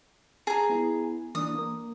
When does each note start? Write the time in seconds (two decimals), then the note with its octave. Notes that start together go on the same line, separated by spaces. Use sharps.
0.47 G#4 A#5
0.69 B3 E4
1.35 E3 A#3 D4 D#6
1.55 A#3 A#4